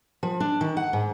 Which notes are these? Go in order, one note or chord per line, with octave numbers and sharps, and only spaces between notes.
F3
D4
D#3
F#5
G#2